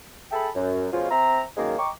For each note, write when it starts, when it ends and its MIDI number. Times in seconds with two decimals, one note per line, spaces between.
0.32 0.48 68
0.32 0.48 69
0.32 0.48 76
0.32 0.48 79
0.32 0.48 81
0.32 0.48 83
0.55 0.86 42
0.92 1.09 47
0.92 1.09 53
0.92 1.09 56
0.92 1.09 61
0.92 1.09 65
1.09 1.43 60
1.09 1.43 72
1.09 1.43 76
1.09 1.43 82
1.57 1.77 42
1.57 1.77 51
1.57 1.77 54
1.57 1.77 56
1.57 1.77 58
1.78 1.90 75
1.78 1.90 79
1.78 1.90 82
1.78 1.90 85
1.78 1.90 86